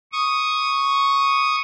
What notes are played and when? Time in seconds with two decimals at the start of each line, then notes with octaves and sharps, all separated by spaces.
0.12 C#6 D#6